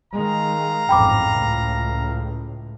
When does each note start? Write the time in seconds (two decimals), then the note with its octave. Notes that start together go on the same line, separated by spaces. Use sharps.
0.14 D#3 G#3 F5 A#5
0.89 A1 F2 G#2 G5 B5 D6
1.32 C#2 A2